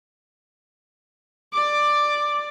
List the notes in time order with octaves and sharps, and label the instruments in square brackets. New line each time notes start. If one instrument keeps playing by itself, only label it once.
[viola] D5 [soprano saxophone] D6